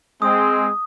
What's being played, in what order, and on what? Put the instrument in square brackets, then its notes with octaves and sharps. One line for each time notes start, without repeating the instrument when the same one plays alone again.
[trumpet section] G#3 C4 [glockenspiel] D#6